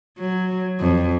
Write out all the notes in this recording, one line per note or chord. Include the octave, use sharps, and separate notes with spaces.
F#3
F2